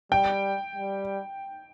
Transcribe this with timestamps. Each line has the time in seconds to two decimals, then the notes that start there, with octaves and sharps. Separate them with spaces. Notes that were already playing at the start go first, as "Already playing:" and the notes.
0.12 G3 G5
0.76 G3